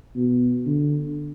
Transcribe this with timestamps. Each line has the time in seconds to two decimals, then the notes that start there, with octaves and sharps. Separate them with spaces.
0.16 B2
0.66 D3